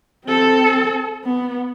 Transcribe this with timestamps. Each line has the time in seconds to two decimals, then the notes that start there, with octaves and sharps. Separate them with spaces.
0.25 C4 A4
1.24 B3